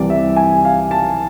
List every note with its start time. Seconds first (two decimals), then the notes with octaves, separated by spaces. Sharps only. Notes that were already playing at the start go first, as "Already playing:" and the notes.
Already playing: C2 C3 E3 D5
0.10 E5
0.36 G#5
0.65 F5
0.91 A5